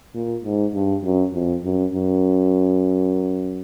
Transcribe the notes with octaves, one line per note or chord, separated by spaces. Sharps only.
A#2
G#2
G2
F#2
F2
F#2
F#2